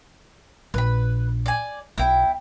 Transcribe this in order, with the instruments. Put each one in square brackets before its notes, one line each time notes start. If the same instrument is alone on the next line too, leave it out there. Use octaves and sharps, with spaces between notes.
[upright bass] A#1 [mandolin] B4 B5
[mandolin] D5 G#5
[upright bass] B1 [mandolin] E4 G5